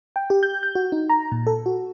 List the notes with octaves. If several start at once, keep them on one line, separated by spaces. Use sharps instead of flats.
G5
G4
G6
G6
F#4
D#4
A#5
A#2
A4
F#4